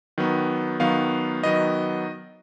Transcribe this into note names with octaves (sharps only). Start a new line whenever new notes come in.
D#3 F#3 B3
D#3 F#3 B3 F5
D#3 F#3 B3 D#5